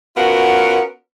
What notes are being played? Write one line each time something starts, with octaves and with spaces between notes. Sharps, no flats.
B3 C#4 F4 F#4 A#4